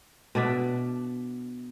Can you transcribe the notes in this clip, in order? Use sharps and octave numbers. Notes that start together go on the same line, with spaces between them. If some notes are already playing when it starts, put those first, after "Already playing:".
B2 D4 D5 E5